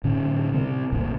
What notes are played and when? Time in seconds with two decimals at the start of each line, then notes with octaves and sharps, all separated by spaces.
0.04 A2 D3 C#4
0.52 C3 G3 C4
0.92 A1 E2 A#2 D3